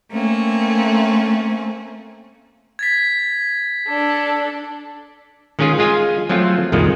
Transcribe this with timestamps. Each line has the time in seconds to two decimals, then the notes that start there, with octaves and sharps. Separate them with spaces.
0.11 A3 A#3 C4 C#4
2.79 G#6 A6 B6
3.86 D4 A4
5.59 D#3 G#3 C#4 F4 G#4
5.79 G#3 F4 G#4 F5 G#5
6.29 F3 F#3 A3 C4 F4
6.72 C2 F2 A#2 D#3 F3 G#3